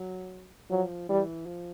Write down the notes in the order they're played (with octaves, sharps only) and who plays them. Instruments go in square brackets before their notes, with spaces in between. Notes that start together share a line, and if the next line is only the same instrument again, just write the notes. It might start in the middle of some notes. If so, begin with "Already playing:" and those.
Already playing: [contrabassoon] F#3
[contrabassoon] F3 [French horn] F#3
[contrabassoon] E3 [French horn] G3
[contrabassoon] F3